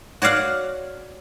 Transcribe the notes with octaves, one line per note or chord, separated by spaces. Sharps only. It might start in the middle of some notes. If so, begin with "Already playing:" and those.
F#4 C#5 D5 F5 F#5